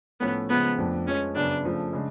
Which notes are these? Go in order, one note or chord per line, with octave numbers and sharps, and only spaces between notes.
A2 F3 A3 B3 C#4
C#3 F3 G#3 B3
F2 F3 A3 D4
F3 G#3 B3 C#4
F#2 C#3 F#3 B3 D4
C#3 F3 A3
C#3 G#3 D4